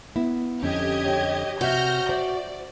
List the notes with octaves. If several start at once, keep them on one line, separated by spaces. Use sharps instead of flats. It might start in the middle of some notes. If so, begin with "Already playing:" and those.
B3 E4
F2 D3 C#4 G4 D#5 G#6
C#5 G5
C3 F#4 E5 F6 G6 A#6
C5 D5 E5